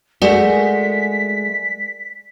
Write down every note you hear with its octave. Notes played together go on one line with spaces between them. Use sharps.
G#3 A3 F#4 A#4 D5 G#5 B6